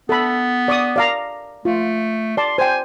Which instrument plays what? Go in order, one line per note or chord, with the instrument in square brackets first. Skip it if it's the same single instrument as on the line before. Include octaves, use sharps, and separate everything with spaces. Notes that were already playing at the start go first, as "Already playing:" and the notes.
[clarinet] B3 [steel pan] A4 B5
[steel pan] D5 C#6 D#6
D5 F5 A#5
[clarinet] A3 [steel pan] F4
[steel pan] D5 A5 [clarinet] C6
[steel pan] C5 G5 [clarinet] G#5